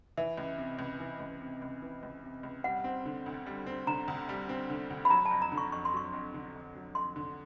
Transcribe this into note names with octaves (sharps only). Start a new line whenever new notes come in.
E3 E5
C#2
C3
C#2
E3
C#2
C3
C#2
E3
C#2
C3
C#2
G3 F#5
C4
D3
D2
G3
C4
D3 A#5
D2
G3
C4
D3
D2
B5
F#3 A#5
A5
F2
A#5
D3
C#6
F2 C#6
C6
F#3 C#6
F2
D3
F2
F#3
F2 C6
D3